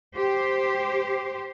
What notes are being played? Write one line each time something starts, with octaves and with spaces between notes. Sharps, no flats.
G4 C5